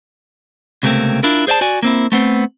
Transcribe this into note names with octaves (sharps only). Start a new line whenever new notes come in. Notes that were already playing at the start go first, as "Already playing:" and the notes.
C#2 C3 A3 A#3 C4
D4 E4 F4 A#4
G#4 C5 D5 E5 A5
F#4 D5 G#5
A#3 C4 E4
A3 B3 C4